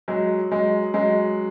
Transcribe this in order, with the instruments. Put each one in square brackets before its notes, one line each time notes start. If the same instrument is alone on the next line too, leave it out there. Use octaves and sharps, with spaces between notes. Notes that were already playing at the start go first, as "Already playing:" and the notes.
[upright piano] F#3 G#3
F#3 G#3
F#3 G#3